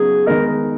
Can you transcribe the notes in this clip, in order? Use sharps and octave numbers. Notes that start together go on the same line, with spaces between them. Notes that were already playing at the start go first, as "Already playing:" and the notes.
Already playing: C#3 F#3 B3 D#4 G#4
D#3 G#3 B3 D#4 A#4